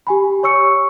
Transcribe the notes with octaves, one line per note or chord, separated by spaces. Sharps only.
G4 G#5 B5
C#5 C#6 E6 C#7